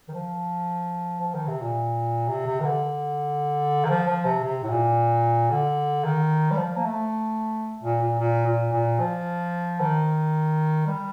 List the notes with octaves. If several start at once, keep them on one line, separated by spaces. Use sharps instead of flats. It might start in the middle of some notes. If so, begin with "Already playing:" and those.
D#3
F3
F3
D#3
C3
A#2
C3
C3
D#3
D3
D#3
F3
F3
C3
C3
A2
A#2
D3
D#3
G3
F3
A#3
A3
A#2
A#2
A#2
A#2
A#2
F3
D#3
G3